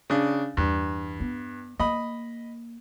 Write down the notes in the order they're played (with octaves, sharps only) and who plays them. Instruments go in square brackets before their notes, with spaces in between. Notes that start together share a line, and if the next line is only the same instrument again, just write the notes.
[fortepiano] C#3 D4
[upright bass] E2 [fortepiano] G2
[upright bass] B3
[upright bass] A#3 [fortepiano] D#5 B5